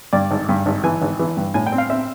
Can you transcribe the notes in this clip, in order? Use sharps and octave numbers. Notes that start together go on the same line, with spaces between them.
G2 D5
G#1
G2
G#1
E3 G#5
G#1
E3
G2
A2 G#5
G5
C4
F5
C4 E5